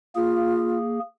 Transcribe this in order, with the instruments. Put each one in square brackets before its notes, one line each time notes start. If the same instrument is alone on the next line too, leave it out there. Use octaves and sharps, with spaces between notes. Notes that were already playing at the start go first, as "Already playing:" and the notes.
[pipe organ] A#3 G#4 [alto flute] F4